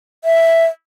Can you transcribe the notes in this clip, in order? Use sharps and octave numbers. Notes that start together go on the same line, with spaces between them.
E5